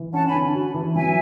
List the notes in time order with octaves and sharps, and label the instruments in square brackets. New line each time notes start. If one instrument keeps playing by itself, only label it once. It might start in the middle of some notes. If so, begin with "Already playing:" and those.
Already playing: [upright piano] E3
[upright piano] C#4 [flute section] F#5 A5
[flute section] G#5 B5
[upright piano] D3
F#4
E3
[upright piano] F#3 [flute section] E5 G#5